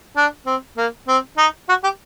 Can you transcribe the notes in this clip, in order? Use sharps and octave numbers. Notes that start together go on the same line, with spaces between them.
D4
C4
A#3
C4
D#4
F#4
G4